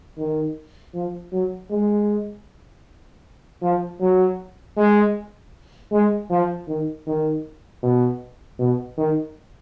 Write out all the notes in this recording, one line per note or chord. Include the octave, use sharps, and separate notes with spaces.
D#3
F3
F#3
G#3
F3
F#3
G#3
G#3
F3
D#3
D#3
B2
B2
D#3